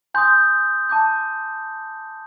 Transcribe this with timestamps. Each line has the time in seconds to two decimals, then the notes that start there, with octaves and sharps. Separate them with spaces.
0.14 G#5 C6 D#6 G6
0.89 A5 D6 G6